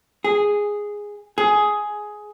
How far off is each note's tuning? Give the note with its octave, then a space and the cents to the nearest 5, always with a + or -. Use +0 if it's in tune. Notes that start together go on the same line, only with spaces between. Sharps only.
G#4 -5
G#4 +10